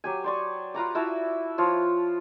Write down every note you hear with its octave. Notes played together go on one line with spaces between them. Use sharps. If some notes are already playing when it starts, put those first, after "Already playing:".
F#3 G4 G#5
C5 D5 C#6
F4 B4 A#5 D6
E4 F#4 E5 A5
F3 F4 C#5